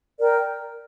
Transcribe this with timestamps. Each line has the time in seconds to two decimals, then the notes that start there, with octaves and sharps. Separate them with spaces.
0.20 A#4 D5 G5